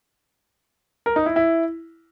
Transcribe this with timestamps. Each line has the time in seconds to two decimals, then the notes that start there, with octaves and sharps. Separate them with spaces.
1.06 A#4
1.16 D#4
1.26 E4
1.36 E4